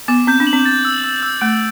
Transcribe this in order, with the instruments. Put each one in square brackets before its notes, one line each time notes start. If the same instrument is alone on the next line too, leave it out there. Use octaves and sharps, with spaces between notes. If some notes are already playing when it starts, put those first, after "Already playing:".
[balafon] B3 [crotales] D6
[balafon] C4 [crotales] G6
[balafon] D4
[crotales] F#7
[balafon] C4
[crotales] A6
E6
E6
E6
[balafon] A3 [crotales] D7